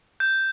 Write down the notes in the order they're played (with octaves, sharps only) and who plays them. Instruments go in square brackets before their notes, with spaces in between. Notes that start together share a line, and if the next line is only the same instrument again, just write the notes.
[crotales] G6